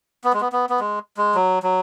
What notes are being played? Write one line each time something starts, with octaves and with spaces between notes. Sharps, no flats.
B3
G#3
B3
B3
B3
G#3
G#3
F#3
F#3